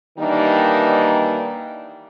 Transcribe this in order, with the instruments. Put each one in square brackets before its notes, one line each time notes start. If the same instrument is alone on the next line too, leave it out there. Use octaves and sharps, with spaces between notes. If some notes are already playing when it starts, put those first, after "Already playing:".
[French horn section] D#3 E3 G3 A#3 D4 D#4